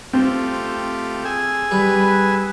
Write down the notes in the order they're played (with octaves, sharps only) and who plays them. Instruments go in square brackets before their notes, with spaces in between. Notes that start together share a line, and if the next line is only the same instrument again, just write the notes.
[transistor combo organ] A3 F4 G4 [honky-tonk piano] C4
[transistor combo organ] G#4 G#5 E6
[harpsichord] G3 [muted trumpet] B4